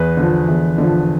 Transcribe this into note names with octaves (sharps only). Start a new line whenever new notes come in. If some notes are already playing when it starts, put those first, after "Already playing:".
Already playing: E2 B4
D3 F3
E2
D3 F3